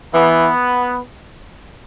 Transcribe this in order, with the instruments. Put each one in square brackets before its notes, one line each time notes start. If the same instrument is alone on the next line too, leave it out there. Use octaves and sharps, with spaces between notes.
[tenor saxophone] E3 [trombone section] B3